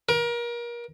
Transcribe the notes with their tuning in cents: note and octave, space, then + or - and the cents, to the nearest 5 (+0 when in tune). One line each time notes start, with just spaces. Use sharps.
A#4 +30